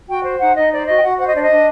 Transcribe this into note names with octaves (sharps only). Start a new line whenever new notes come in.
F#4 G5
C5
D#4 F#5
D#4 D#5
C5 D5
F#4 D#5
G5
F#4 F#5
C5 F#5
D#5
D4 D5
D#5
D4